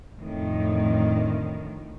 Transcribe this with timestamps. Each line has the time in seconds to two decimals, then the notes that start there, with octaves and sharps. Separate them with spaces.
0.18 F2 A2 D3 D#3